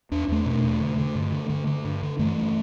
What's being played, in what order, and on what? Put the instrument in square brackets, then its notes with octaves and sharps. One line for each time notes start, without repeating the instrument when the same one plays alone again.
[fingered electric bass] E2 D4
E2 A3 D4
B2
E2
D3
D3
G2
D3
D3
D3
G2
D3
G2 E3 A3
G2